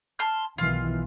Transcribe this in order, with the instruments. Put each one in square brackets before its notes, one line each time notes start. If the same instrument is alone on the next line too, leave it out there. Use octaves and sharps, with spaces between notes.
[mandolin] A5 C6 F6
[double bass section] B1 D#3 E3 [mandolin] F4